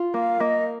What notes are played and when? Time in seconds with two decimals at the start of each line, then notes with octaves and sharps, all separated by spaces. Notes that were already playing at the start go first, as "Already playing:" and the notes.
Already playing: F4
0.14 A#3 F5
0.40 A#3 D#5